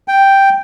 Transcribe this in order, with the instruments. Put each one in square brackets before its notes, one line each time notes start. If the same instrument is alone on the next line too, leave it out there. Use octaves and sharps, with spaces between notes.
[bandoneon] G5